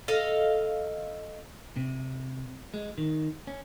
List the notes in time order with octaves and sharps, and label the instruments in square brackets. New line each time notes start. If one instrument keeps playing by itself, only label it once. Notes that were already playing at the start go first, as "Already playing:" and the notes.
[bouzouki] A4 D#5 F5
[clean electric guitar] C3
G#3
D#3
C#4